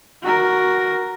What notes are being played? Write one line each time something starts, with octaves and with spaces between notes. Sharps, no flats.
F#4 A#4